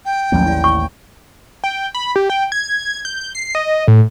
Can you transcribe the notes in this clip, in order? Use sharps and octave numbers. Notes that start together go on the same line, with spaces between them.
G5
A1 D#2 F3 F#3 A#3 C#4
E4 D5
C#6
G5
B5
G4
G5
G#6
G6
C7
D#5
A2